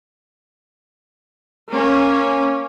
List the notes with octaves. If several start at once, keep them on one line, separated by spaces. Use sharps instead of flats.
A#3 C#4